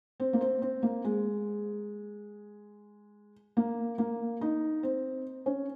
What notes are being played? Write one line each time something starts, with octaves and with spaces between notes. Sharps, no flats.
C4
A#3
C4
C4
A#3
G#3
A#3
A#3
D#4
C4
C#4